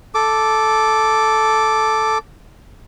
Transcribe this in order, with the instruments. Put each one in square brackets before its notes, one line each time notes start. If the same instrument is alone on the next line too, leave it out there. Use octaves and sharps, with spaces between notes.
[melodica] A4 D6